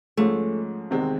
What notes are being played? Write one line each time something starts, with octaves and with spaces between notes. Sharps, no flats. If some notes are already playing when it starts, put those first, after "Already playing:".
G#2 F3 G#3 A3 C#4
E2 C3 D#3 G#3 C4